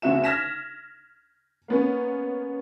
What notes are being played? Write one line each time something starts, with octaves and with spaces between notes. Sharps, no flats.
D2 C#3 F#4 E5 E7
F6 G#6 A#6 B6 E7
A#3 B3 C#4